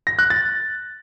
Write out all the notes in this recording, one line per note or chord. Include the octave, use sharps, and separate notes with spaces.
A#6
F#6
A6